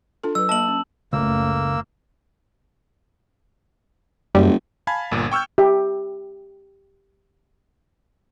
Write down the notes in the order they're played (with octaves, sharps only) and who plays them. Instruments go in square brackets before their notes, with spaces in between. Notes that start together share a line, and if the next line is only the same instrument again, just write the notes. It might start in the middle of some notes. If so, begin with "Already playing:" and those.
[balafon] D4 F4 A4
[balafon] F#3 B4 [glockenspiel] E6
[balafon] A#3 D#5 [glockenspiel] A5 F#7
[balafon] C#4
[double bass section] F#1 A3 [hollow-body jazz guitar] C#2 [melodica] A#3 E6
[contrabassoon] F#1 [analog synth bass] F#2 [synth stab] G3
[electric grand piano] F5 G#5 A5 B5 G#6
G1 A#2
G5 C#6 E6 F6 G6
[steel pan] G4 E5